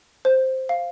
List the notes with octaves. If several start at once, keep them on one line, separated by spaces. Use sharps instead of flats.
C5
F5